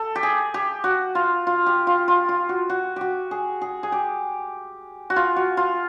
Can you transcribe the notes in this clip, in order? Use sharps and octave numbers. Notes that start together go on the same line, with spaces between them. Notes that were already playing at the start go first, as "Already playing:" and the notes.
Already playing: A4
G4
G#4
G4
F#4
F4
F4
G4
F4
F4
F4
F#4
F#4
F#4 G4
G#4
G#4
G#4
G4
F#4
F4
F#4
F4